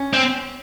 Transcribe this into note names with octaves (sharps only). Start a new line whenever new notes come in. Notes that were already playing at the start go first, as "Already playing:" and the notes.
Already playing: C#4
C4